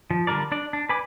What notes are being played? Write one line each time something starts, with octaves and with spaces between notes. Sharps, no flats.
F3
D3 G3 D4 A#4 D5
D4 D5
D4
B4 G#5 B5 D6